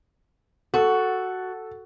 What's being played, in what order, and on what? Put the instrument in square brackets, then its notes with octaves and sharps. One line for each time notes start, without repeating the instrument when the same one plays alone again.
[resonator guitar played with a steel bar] F#4 [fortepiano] A4